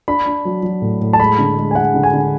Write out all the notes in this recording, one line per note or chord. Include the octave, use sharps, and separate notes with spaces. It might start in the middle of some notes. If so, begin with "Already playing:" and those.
D4 B5
D4
F#3
F#3
A2
A2
A5
G#3 B5
D3
G#3
G#5
G#3 F#5
D3
G#5
D3